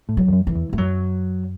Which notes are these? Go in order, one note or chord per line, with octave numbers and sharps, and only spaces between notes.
A2
F#3
E2
F#2
E3
E2
A3
F#2 F#3